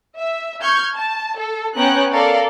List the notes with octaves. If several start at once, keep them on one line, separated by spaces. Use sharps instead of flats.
E5
C#6 F6 G6 G#6
A5
A4
B3 C#4 G5 A#5 F#6
A4 A#4 D5 F5